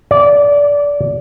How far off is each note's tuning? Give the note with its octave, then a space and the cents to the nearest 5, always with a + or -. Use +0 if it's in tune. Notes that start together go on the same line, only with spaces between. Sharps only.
D5 -20